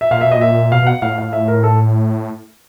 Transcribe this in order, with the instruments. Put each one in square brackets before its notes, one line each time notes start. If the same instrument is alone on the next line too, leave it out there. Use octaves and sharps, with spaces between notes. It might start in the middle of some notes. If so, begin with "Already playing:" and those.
[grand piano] E5
[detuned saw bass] A#2 [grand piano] F5
[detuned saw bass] B2 [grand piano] E5
[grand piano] D#5
[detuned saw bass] A#2 [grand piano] E5
[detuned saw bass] B2 [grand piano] F5
[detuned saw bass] B2 [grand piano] F#5
[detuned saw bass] A2 [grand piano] F5
[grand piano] F5
E5
A#4
A4